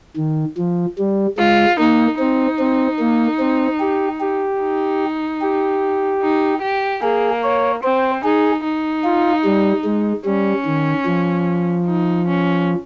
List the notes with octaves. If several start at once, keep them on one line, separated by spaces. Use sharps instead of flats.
D#3
F3
G3
G#3 F4
A#3 D#4
C4 D#4
C4
A#3
C4
G4
G4
D#4
G4
D#4
G4
A#3 G#4
C#5
C4 C5
D#4 G#4
D#4
F4
G3
G#3
G3 C#4
D#3
F3
D#4
C#4